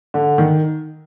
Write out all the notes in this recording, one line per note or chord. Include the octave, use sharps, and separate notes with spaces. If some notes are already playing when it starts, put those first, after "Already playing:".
D3
D#3